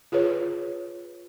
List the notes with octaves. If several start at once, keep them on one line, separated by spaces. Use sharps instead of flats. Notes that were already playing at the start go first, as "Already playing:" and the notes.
F4 G#4 B4 C#5